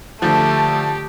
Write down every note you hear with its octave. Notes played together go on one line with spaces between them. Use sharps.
D3 F3 A3 G4 A5